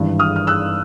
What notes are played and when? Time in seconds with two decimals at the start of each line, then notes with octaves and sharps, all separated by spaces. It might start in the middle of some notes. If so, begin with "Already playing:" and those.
Already playing: G#1 G2 E3
0.19 D#6 F6
0.36 F6
0.47 E6 F#6